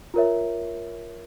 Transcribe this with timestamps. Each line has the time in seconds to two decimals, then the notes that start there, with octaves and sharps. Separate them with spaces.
0.14 F4 A#4 C#5 E5